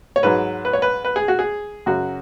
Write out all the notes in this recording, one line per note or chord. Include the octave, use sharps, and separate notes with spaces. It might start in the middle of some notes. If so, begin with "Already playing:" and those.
C#5
G#2 F#3 B4
B4
C#5
B4
B4
G#4
F#4
G#4
F#2 C#3 F#3 F#4